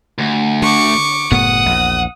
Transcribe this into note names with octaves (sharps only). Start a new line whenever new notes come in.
D2
D3 C#6 D6
F#1 A2 B3 F#5 D#6
A#1 E2